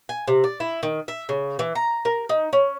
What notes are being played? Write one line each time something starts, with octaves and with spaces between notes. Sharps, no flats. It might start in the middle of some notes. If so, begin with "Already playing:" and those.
G#5
C3
D5
E4
D#3
E5
C#3
E3
A#5
A#4
D#4
C#4